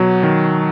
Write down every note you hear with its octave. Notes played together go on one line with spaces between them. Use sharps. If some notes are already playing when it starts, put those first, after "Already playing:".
Already playing: B2 F#3
D#3